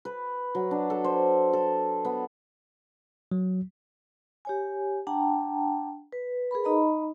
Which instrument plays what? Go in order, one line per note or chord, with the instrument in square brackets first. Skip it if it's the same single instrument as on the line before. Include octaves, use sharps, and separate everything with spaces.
[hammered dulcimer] B4
F#3
D4
A4
C5
A4
B3
[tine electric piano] F#3
[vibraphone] G4 C#5 G#5
D4 F#5 G5 A5 A#5
B4
G#4 A#4 B4 B5
D#4 D#5 A#5 B5